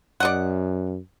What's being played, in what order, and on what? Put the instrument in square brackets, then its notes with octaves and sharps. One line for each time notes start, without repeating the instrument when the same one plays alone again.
[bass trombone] F#2 [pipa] D5 D#5 F#5